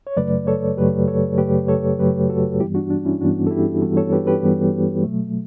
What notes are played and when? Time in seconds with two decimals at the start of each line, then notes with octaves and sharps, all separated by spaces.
0.07 C#5
0.17 F#2 C#3 F#3 A3 B4 D5
0.47 A4 C#5
0.77 F#2 C#3 F#3 A3 G4 B4
1.07 A4 C#5
1.38 F#2 C#3 F#3 A3 G4 B4
1.68 A4 C#5
1.99 F#2 C#3 F#3 A3 G4 B4
2.29 F#4 A4
2.59 G2 E3 G3 B3 E4 G4
2.75 D4 F#4
2.90 D4
3.05 C#4 E4
3.21 G2 E3 G3 B3 D4 F#4
3.47 A4
3.51 E4 G4
3.82 G2 E3 G3 B3 F#4 A4
3.97 A4 C#5
4.12 G4 B4
4.27 G4 B4
4.42 G2 E3 G3 B3
5.03 B2 F#3 A3